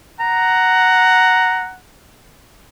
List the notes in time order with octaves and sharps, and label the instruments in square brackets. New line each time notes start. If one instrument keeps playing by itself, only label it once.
[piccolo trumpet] F#5 [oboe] A#5